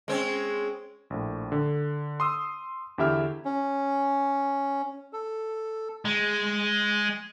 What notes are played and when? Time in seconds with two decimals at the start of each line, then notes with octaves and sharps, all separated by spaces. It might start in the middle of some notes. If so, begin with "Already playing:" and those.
0.08 G#3 C4 C#4
1.10 A#1 A2
1.52 D3
2.20 C6 D#6 E6
2.98 E2 D3 E4 G4 E5 F6
3.45 C#4
5.13 A4
6.05 G#3